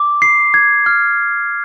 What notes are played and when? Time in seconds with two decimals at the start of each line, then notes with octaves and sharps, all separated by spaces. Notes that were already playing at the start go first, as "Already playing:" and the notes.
Already playing: D6
0.22 C7
0.54 G#6
0.86 F6